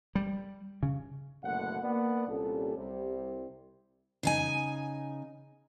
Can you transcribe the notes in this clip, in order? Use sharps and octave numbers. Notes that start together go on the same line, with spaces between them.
G3
C#3
F#1 B2 D3 A3 F#5
A#3 B3 D4 D5 F#5
C2 A#2 G3 C#4 G4 A4
C2 C3 G3
C#3 D#4 G#5